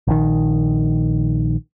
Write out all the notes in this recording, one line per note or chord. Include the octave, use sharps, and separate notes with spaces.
A#1 D#3